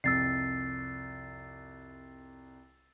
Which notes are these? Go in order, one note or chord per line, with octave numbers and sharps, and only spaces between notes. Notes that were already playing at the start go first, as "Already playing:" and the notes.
C2 F2 C3 E6 A6 C7